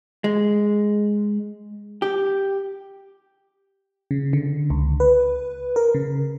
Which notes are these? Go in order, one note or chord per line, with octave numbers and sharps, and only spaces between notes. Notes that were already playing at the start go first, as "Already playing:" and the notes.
G#3
G4
C#3
D3
C#2
B4
A#4
C#3